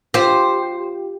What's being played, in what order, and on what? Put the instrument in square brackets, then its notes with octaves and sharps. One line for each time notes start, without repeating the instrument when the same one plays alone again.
[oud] F4 [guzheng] G4 [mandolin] C5